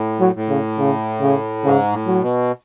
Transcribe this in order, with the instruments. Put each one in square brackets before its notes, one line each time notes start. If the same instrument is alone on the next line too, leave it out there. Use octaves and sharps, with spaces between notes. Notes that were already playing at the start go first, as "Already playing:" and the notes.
Already playing: [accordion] A2
[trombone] F#3
[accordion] A2
[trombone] C#3
C#3
C#3
[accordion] G#2 [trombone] C#3
[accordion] A2
[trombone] F#3
[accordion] B2